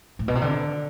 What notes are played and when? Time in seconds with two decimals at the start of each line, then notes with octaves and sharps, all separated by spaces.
0.19 A2
0.28 B2
0.35 C3
0.42 D3